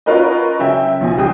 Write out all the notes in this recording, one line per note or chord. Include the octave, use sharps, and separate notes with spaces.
C#4 F4 F#4 A#4 B4 D#5
C#3 F#3 E5 G5
B1 F3 G#5
C#2 G3 G5 D#6